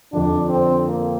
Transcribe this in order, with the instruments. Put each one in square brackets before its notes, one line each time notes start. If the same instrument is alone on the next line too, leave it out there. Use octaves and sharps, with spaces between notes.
[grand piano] F2 D3 F3 [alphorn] D4
[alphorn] C4
A#3